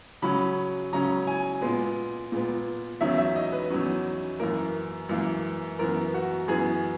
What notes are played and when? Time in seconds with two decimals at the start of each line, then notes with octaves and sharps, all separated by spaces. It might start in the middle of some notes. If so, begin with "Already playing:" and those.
0.22 C#3 F#3 C#4 B5
0.93 C#3 F#3 C#4 A#5
1.27 G#5
1.61 A#2 G#3 B3
2.32 A#2 G#3 B3
3.01 E2 D#3 F#3 C#4 E5
3.18 E5
3.36 D#5
3.52 B4
3.70 E2 D#3 F#3 C#4
4.40 F#2 E3 A#3 A#4
5.09 F#2 E3 A#3
5.79 F#2 E3 B3 A#4
6.14 F#4
6.48 F#2 E3 B3 G#4